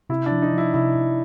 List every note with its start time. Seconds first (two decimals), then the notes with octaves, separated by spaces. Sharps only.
0.10 C3 E4
0.26 F3 D4
0.42 D#4
0.53 F3
0.58 E4
0.74 C3 E4
0.95 C3